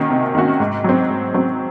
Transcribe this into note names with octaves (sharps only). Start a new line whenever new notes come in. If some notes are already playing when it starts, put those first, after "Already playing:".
Already playing: D#3 A#3 C#4 F#4
C3
D#3 A#3 C#4 F#4
G#2
F#3 C4
G#2
F#3 C4